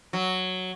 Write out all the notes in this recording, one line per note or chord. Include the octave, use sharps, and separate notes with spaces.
F#3